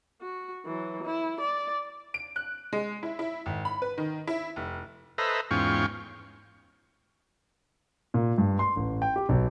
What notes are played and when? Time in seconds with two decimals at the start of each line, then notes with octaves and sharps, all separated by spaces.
0.22 F#4
0.65 E3 F#3
1.03 E4
1.40 D5
2.14 D7
2.36 F#6
2.73 G#3
3.03 E4
3.19 E4
3.46 G#1
3.65 B5
3.82 B4
3.98 D#3
4.27 E4
4.56 F1
5.18 A4 B4 C5 D#5 E5 A#5
5.51 E2 G#2 C#4 F4 G5 C#6
8.14 A#2
8.38 G2
8.59 C6
8.76 A1
9.02 G5
9.16 G4
9.29 B1